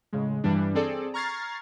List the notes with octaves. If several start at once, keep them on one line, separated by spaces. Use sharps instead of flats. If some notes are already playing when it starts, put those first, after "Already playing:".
A2 C#3 G#3
G2 E3 G3 D4
C4 G#4 A4 D5
A#5 C#6 F6 G#6 A6 C7